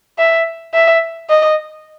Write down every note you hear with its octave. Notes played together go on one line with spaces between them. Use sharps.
E5
E5
D#5